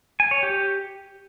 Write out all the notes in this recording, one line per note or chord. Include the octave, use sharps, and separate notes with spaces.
G#5
C#5
G4